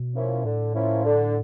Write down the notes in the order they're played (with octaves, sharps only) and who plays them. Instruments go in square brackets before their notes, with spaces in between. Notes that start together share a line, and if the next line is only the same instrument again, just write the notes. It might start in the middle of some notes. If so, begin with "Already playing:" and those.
Already playing: [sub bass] B2
[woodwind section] F3 A#3 C#4 E4
[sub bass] A2 [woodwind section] D3
[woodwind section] F3 A#3 C#4 E4
D3